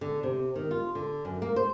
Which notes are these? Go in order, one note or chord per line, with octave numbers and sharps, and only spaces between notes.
D3
C3
D#3
F4
D3
F#2
A#3
C5